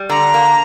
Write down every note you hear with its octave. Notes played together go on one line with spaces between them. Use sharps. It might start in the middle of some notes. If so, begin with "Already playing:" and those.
Already playing: G3
D3 A#5
A#3